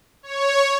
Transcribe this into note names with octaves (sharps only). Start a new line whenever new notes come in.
C#5